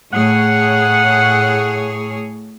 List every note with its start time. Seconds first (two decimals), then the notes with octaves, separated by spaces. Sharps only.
0.13 A2 G#4 C#5 F#5